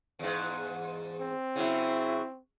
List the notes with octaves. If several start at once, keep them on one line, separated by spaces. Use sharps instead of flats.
E2 G#2
C4
C#3 F#3 E4